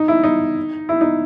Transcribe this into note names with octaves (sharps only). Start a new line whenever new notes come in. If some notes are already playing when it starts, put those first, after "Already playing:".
Already playing: D#4
E4
D#4
E4
D#4